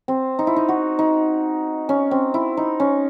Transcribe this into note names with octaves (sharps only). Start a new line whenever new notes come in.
C4
D#4
E4
D#4
F#4
D#4
C#4
C4
E4
D#4
C#4